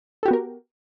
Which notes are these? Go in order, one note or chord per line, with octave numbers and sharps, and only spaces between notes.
B3 F#4 G4 A4 A#4